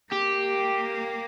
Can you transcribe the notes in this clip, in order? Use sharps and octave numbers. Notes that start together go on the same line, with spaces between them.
A#3 G4